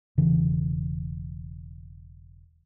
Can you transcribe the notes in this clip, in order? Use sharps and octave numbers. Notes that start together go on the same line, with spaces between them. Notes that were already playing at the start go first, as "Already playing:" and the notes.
E1 C#3 E3